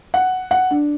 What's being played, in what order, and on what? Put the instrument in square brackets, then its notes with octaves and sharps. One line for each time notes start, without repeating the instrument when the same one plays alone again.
[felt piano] F#5
F#5
D4